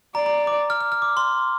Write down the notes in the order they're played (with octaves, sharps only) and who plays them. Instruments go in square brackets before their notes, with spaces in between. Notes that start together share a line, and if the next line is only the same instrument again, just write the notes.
[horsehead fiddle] D5 [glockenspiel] A#5
[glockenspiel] A#5
D6
F6
F6
F6
D6
C6